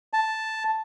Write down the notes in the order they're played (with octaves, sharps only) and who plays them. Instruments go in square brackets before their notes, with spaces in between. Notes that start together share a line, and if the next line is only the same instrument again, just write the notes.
[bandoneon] A5